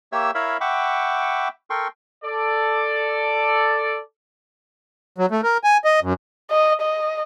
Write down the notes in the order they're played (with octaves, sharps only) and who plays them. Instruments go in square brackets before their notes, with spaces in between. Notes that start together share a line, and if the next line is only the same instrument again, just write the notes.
[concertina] A#3 G4 C#5 E5 E6
E4 A#4 C#5 E5 F5 B5
E5 F#5 G5 B5 C#6 D6
A4 A#4 G5 C6 C#6
[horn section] A4 D5
[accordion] F#3
A3
A#4
G#5
D#5
F#2
[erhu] D#5
D#5